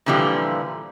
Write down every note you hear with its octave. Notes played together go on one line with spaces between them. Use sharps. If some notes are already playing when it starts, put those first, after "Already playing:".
A#2 D3 E3 F3 G3